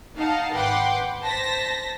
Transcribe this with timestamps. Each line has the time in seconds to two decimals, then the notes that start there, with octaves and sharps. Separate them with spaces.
0.16 D#4 F5 F#5 A5
0.53 G#1 B4 F#5 G5 C6 D6
1.23 C5 A5 A#6 B6